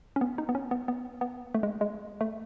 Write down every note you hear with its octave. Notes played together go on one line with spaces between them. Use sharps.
C#4
B3
D#4
B3
C#4
B3
B3
B3
A3
G#3
G#3
A3